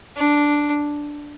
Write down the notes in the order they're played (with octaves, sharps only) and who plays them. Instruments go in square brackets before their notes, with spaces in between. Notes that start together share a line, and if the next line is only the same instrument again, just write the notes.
[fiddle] D4